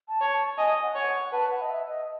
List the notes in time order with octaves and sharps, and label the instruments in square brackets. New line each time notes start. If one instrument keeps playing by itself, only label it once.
[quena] A5
[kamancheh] C#5
[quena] A5
[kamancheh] D#5 [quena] G#5
[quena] G#5
F#5
[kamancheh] C#5
[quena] F#5
[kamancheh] B4 [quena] A5
[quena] F#5
D#5
E5
D#5